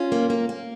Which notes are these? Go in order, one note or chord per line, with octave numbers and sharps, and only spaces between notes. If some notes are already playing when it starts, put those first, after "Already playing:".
Already playing: C#4 F4
A#3
A#3
A#3